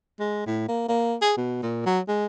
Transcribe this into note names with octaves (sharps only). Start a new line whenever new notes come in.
G#3
A2
A#3
A#3
G#4
B2
A#2
F#3
G#3